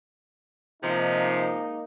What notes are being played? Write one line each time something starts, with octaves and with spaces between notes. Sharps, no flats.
C3 F3 G#3 A#3 D#4